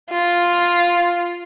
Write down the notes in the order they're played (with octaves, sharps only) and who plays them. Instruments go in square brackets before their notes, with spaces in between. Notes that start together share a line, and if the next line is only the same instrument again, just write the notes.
[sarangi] F4